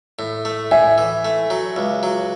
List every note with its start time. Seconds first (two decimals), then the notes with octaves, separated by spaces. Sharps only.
0.19 A2
0.45 A3
0.71 A2 E5 G#5
0.98 E3
1.25 A3
1.50 F#3
1.76 C#2
2.03 F#3